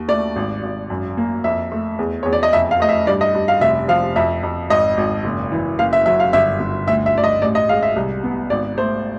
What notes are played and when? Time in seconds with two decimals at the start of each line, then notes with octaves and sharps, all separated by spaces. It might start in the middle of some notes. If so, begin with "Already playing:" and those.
Already playing: D#2
0.08 A3 D5
0.36 G#1
0.63 G#1
0.90 F#2
1.17 A#3
1.44 F2 E5
1.72 A3
1.99 E2
2.23 E2 C#5
2.33 D5
2.43 D#5
2.53 F2 E5
2.71 F5
2.80 A3 D#5
2.89 E5
3.07 G2 D5
3.21 D#5
3.34 G2
3.48 F5
3.61 F1 E5
3.88 F3 F5
4.16 F2 E5
4.43 F2
4.70 G#1 D#5
4.97 G#1
5.24 F#1
5.52 E3
5.79 F#1 F5
5.93 E5
6.06 F#3 E5
6.20 F5
6.33 G1 E5
6.60 G1
6.87 D2 E5
7.06 E5
7.15 D2 D5
7.24 D#5
7.42 A1 D5
7.55 D#5
7.69 G#3 F5
7.83 E5
7.96 C2
8.23 B3
8.50 G#1 D5
8.78 A3 C5